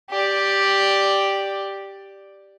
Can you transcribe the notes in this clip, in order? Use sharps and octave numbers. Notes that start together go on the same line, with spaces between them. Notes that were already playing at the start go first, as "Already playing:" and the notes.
G4 D5